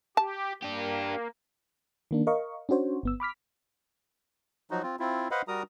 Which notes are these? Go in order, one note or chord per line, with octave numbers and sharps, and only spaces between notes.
G4 A5
A#3 D4 G4
D#3 A#3 D4
A#4 D#5 F5 C#6
C#4 D4 F#4 C5 C#5
G1 B3 E6
B5 D6 F6 B6
F3 F#3 D#4 F#4
C4 F4
C4 E4 F4
B4 C5 D#5 F5 F#5 B5
G3 F#4 A#4 A#5 D#6